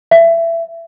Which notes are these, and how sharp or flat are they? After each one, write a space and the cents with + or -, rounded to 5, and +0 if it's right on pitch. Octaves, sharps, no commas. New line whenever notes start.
E5 +20